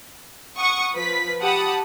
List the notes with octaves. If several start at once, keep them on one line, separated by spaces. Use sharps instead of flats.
F#5 C#6 D#6
F3 B4 B6
G4 F#5 A5 B5 D#6